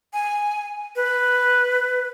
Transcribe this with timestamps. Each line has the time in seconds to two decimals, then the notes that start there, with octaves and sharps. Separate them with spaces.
0.13 G#5
0.96 B4